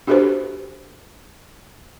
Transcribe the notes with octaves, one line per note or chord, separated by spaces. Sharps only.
D4 F#4 G4 A4 B4 C5